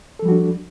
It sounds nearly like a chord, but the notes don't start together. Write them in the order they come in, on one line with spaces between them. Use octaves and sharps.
A4 F3 G3 F#4 D4